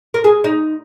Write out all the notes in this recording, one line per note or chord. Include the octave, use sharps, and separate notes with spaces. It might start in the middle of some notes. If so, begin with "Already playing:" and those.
A#4
G#4
D#4